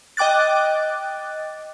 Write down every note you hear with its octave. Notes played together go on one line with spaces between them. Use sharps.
D#5 G5 D6 F#6 A6